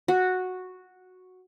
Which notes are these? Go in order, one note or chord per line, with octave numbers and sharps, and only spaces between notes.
F#4